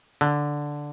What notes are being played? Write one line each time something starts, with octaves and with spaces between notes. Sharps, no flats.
D3